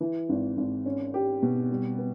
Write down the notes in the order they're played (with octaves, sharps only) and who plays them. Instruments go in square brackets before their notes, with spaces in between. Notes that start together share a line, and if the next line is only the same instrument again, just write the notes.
[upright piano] E3
G#1
G#1
C#4
G4
B2
G3
B3